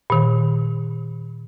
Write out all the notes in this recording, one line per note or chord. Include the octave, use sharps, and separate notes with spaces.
A#2 D#3